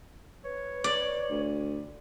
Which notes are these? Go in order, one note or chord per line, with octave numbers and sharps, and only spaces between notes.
B4 C#5
D5
D2